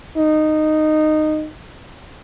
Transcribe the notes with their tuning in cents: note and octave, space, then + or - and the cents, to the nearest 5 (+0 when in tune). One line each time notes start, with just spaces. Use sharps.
D#4 -15